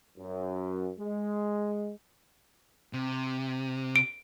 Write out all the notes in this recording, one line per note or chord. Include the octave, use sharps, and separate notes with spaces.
F#2
G#3
C3
D7